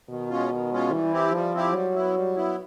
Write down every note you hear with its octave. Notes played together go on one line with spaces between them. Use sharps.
B2 D#3
G#3 C#4 F4
D#3
G#3 C#4 F4
E3 G3
C4 E4 G4
F3 G3
C4 E4 G4
F#3 G3
B3 E4
G3
B3 E4